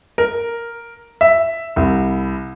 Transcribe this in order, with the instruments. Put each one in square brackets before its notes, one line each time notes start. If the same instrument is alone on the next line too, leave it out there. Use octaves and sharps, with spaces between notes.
[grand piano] A#4
E5
C2